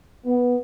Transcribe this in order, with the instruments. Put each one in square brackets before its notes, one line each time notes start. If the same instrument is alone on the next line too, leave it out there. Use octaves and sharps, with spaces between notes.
[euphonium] B3